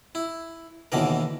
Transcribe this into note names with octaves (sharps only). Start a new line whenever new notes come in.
E4
D#2 B2 D3 E3 A#4